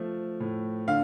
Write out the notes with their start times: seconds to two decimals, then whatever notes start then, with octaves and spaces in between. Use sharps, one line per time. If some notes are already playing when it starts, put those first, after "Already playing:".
Already playing: F3 A3
0.40 A2
0.88 D3 F5